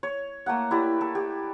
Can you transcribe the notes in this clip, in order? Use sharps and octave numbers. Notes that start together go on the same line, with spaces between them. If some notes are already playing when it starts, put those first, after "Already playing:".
C#5
A3 A#3 F#5
E4 G4 D5
A4
G4